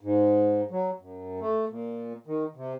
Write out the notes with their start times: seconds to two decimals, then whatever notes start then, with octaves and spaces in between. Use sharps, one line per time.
0.01 G#2
0.71 F#3
1.00 F#2
1.40 A3
1.70 A#2
2.27 D#3
2.56 C3